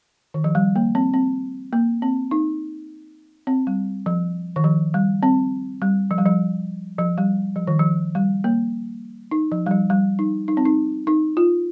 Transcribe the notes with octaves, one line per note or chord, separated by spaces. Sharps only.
D#3
F3
G3
A#3
C4
C4
A#3
C4
D#4
C4
G3
F3
D#3
F3
G3
C4
G3
F3
G3
F3
F3
G3
F3
D#3
F3
G3
A#3
D#4
F3
G3
F3
G3
D#4
D#4
C4
D#4
D#4
F4